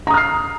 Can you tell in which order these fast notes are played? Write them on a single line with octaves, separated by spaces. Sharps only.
A#5 D#6 F6 C7